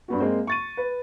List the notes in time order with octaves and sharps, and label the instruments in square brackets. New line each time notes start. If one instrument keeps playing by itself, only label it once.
[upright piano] G2 B3 F#4
G#3 A#3 C4
C#6 A6 D#7
B4